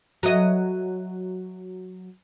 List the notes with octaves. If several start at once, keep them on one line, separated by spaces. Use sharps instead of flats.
F#3 D#5